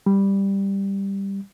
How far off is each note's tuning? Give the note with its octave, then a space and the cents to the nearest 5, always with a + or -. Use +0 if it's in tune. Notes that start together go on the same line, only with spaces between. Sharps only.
G3 +5